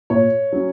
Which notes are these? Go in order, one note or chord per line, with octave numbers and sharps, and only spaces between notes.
A#2 C#5
F#3 C#4